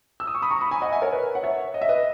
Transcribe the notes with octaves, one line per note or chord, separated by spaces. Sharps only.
E6
D#6
C#6
B5 D#6
A#5 C#6
B5 D#6
G#5 B5
D#5 F#5
E5 G#5
A#4 C#5
B4
F#5
C#5 E5
D#5
E5
B4 D#5